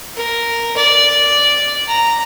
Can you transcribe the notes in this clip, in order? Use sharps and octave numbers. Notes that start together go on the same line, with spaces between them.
A#4
D5
A#5